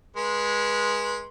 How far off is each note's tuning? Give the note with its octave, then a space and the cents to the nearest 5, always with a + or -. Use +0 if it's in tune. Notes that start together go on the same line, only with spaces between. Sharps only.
G#3 +0 B4 -30 C6 +0